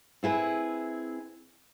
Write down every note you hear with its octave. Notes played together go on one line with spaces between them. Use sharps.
C4 E4 G#4 B4